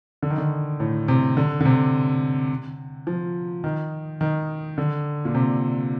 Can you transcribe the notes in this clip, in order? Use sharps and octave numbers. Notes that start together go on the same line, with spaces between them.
D3
D#3
D3
A2
C3
D3
D3
C3
F3
D#3
D#3
D3
A#2
C3